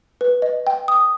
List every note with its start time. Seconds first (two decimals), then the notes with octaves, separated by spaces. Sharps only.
0.21 B4
0.42 D#5
0.67 G5
0.88 D#6